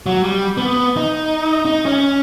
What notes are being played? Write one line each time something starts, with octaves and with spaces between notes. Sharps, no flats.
F#3
G3
B3
D#4
D#4
C#4